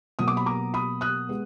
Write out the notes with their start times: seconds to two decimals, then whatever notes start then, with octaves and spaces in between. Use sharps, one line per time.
0.19 B2 F#3 A#3 D#6
0.28 D6
0.37 B5
0.46 A#5 D6
0.74 B5 D#6
1.01 D#6 F#6
1.29 G#3 B3